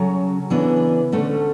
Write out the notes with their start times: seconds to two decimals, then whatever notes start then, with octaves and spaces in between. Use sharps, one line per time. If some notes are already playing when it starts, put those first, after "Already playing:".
Already playing: C#3 F#3 C#4 A4 C#5
0.50 C#3 E3 B3 D4
1.12 D2 D3 A3 C#4